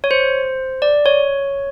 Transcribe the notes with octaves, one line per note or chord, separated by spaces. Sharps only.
C#5
C5
D5
C#5